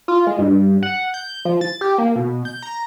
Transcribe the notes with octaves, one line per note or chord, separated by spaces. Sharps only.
F4
G#3
G2
F#5
G6
F3
A6
G4
A#3
B2
G6
A#5